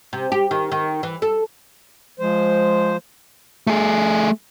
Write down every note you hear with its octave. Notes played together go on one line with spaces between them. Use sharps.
C3
G4
D#3
D#3
E3
A4
F3 G#3 C5
A3 G#4